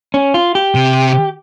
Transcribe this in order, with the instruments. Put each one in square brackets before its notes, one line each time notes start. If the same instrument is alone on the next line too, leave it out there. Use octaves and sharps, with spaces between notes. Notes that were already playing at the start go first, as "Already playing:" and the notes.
[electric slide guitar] C#4
F4
G4
[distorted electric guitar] C3